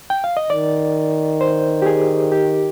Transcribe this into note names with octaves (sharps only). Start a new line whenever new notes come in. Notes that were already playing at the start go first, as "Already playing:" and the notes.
G5
F5
D#5
D#3 D5
C5
G4
G#4
G4